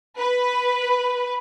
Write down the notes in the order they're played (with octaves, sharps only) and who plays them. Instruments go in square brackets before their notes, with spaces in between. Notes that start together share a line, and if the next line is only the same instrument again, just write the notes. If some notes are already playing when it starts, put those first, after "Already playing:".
[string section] B4